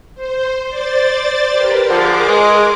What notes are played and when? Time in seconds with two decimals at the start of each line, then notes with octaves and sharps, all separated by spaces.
0.14 C5
0.69 C5 D5 A6
1.51 G4 A#4 B4
1.90 D3 F3 G#4 A#4 D6
2.28 G#3